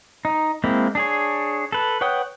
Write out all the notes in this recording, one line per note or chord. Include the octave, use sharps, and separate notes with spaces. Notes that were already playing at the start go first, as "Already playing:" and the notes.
D#4
G#3 A#3 C4 E4
D4 G#4 C#5
A4 B4
B4 C#5 F#5 G5 D#6